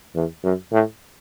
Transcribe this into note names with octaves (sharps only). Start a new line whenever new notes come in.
E2
F#2
A2